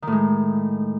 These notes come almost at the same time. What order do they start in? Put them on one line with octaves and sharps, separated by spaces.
D#3 A2 G#3